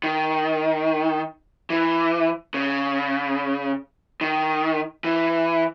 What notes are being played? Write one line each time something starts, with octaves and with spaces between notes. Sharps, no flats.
D#3
E3
C#3
D#3
E3